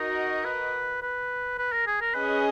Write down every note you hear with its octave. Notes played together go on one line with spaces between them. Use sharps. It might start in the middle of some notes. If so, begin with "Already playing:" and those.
Already playing: D#4 F#4 A#4 D#5
B4
B4
B4
A#4
G#4
A#4
C#4 G#4 B4 D#5